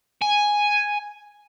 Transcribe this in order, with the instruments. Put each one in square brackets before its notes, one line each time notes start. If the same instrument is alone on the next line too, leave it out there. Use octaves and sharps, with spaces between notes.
[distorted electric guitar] G#5